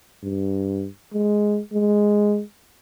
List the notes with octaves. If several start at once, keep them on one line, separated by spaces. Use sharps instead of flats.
G2
G#3
G#3